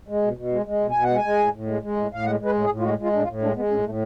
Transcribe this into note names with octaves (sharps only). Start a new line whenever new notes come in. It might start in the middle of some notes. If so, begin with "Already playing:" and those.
G#3
B2
B2
G#3
G#3
B2
B2 G#5
F#5
G#3
G#5
G#3
A2
A2
G#3
G#3
A2
A2 F5
G#3 F#5
G#3
B4
A2
G#4
A2
F4
G#3 F#4
G#3 F4
A2 D4
F4
A2
G#3 D4
G#3 B3
A2 C#4
A2 A3